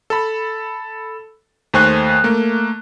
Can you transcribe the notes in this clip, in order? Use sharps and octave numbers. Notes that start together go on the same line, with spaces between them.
A4 B5
D#2 A3 C5 G#5 C#6 F#6
A3 A#3